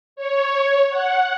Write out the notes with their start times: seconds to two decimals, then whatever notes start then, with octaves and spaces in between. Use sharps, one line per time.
0.16 C#5
0.90 F#5